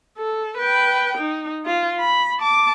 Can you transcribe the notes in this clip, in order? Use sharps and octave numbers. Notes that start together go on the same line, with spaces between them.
A4
B4 G5
D#4
F4
B5
A5 D6